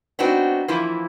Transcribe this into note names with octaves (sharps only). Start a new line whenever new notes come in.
B3 C4 D4 D#4 F#4
E3 F3 A#3 E4